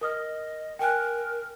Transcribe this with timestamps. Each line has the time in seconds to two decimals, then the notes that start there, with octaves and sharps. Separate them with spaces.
0.01 A#4 D#5 D#6 F6
0.79 A#4 G5 G#5 F#6